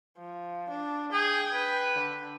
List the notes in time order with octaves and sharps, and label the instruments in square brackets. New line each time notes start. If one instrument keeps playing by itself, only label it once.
[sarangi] F3
D4
[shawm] G#4 [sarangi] G5
[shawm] B4
[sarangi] D3